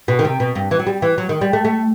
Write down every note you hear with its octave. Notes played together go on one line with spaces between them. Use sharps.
B2
D#3
C3
B2
G2
E3
F#3
G3
E3
F#3
D#3
G3
A3
A3